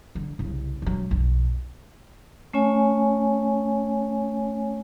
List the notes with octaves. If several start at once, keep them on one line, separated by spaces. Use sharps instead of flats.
D3
C2 C#3
E1 F#3
B1 F2
A3 C#4 C#5 G#5